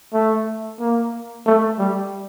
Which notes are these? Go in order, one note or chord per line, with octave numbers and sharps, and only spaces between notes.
A3
A#3
A3
G3